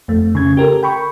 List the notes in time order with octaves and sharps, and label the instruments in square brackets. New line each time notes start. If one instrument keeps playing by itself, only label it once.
[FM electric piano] F2 A3
C#3 G#6
G4 A4 A#4
G5 B5 C#6